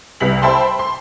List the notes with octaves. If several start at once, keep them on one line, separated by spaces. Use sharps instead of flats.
C2 B4 B6 F#7
C5 E5 G5 A5 B5 C6
C6